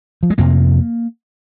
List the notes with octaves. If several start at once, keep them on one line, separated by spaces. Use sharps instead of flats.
F3
G#3
F2 C3 A#3